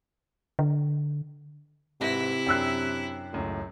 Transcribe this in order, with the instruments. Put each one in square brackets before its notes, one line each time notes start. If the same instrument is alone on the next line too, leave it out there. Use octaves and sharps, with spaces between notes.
[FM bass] D3
[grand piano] G#2 B4 A#6 [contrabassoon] C3 [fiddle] E4
[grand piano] F#2 D4 C7 [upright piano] G5 E6 F#6
[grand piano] C#2 F#2 A2